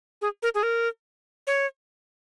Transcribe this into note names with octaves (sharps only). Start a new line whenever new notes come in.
G#4
A#4
G#4
A#4
C#5